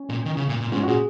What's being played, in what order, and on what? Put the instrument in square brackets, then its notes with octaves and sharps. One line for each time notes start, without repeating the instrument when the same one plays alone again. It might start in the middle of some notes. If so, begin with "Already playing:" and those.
Already playing: [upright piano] C#4
[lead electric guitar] A#2
D#3
C#3
A#2
A#2
[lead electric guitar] G#2 [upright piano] C#4
[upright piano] F#4
[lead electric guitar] A#2 [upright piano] G#4